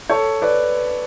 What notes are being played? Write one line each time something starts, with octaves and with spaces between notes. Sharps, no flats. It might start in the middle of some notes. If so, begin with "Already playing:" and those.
A4 C#5
B4 D5